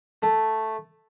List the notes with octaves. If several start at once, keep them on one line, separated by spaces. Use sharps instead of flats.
A3